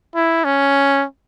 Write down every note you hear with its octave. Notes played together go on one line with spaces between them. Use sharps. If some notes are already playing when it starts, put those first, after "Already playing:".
E4
C#4